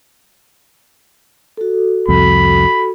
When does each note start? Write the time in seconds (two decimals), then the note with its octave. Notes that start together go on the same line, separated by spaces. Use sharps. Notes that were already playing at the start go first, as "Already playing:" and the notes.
1.57 F#4 A4
2.08 C2 F2 B5